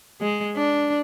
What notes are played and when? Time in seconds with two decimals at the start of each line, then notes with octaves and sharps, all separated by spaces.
0.21 G#3
0.57 D4